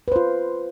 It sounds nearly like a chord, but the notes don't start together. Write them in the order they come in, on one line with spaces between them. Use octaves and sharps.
B4 C5 F4